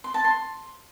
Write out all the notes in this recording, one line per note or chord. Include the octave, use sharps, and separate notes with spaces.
C6
A5
C6